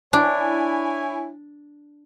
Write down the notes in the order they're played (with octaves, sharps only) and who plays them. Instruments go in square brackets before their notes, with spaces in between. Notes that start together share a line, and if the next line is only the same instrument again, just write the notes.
[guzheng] D4 [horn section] E4 C#5 G#5